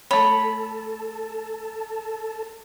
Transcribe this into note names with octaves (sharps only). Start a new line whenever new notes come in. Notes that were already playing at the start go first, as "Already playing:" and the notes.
A3 A4 C#5 A5 B5